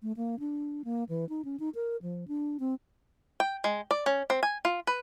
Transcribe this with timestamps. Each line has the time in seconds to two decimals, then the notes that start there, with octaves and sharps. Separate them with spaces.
0.02 A3
0.17 A#3
0.40 D4
0.85 A#3
1.09 E3
1.29 D#4
1.45 C#4
1.60 D#4
1.75 A#4
2.02 F3
2.28 D4
2.60 C4
3.40 G5
3.64 G#3
3.91 D5
4.06 C#4
4.30 C4
4.43 G#5
4.65 F4
4.87 B4